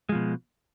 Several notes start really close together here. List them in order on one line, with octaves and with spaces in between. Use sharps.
G#3 F3 B2